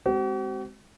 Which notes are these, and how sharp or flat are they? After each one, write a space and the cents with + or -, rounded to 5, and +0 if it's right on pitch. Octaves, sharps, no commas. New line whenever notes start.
G#3 +5 C4 +0 F#4 +45